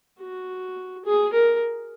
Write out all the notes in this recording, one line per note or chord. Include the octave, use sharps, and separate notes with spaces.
F#4
G#4
A#4